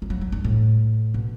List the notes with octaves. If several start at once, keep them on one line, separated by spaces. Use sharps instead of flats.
G3
F#3
F#3
G2
A2
B2